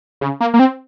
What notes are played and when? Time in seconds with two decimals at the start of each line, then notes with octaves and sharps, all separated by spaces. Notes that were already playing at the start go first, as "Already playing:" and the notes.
0.21 C#3
0.41 A#3
0.54 A#3
0.59 C4